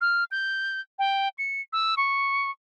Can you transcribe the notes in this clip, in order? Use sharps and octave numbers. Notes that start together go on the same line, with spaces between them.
F6
G6
G5
C#7
E6
C#6